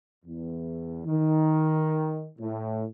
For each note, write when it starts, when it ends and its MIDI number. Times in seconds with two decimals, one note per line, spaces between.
0.25 1.04 40
1.05 2.27 51
2.39 2.85 45